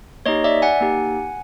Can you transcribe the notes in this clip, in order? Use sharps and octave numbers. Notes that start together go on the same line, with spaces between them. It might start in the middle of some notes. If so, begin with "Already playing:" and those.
A#3 D#4 G4 C#5 D#5
D5 E5
F#5 G#5
A#3 D#4 G4